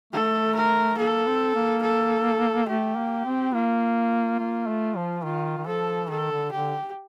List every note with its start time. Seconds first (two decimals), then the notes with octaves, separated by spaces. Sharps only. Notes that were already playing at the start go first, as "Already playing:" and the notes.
0.13 A3 A4
0.55 A#4
0.98 A#3 A4
1.27 C4
1.55 A#3
1.83 A4
2.68 A3 G4
2.97 A#3
3.25 C4
3.54 A#3 F4
4.39 A#3
4.68 A3
4.97 F3
5.24 D#3 F4
5.58 D#3
5.67 F3 A4
6.10 D#3 A4
6.32 D3
6.52 D3 G4